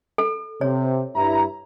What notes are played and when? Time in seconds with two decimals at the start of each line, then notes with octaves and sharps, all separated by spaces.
0.18 A4
0.61 C3 C#5
1.15 G2 E4 A#5